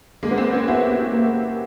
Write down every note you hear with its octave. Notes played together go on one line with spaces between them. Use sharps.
G#3 A#3
B3
A#3 C4
B3 C#4
B3 E4 F#4
G4
E4 F#4
A#3